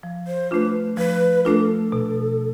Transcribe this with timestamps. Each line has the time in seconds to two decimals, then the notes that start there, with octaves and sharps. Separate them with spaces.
0.03 F3
0.27 C5
0.50 A3 D4 F4 B4 C5
0.97 F3 B4
1.45 A3 D4 F4 A4 A#4
1.92 B2